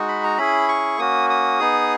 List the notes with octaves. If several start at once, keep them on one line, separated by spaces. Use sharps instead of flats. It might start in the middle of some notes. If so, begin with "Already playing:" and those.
Already playing: G#3 D#4 F#4
B5
A#5
C#4 E4 G#4 B5
C#6
A#3 C#4 F#4 D#6
D#6
B3 D#4 G#4